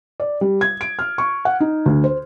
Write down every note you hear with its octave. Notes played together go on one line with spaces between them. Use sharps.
D5
G3
G#6
D7
F6
C#6
F#5
D#4
D2
C5